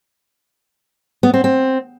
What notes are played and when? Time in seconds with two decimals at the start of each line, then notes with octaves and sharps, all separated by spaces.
1.23 B3
1.34 C4
1.44 C4